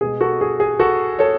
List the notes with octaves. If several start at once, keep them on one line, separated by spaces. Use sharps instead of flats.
B2 G#3 G#4
F#4 A4
G#4
G#4
F#4 A4
A4 C#5